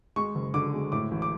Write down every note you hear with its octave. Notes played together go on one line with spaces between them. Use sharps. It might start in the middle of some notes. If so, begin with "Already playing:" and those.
G#3 C#6
F#1
D3 D6
G#3
A2 D6
A1
D6